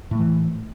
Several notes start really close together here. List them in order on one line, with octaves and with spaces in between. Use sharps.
A2 A3 E3